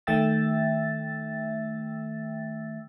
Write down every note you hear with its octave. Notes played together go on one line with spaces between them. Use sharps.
D#3 A3 E5 G5 E6 A6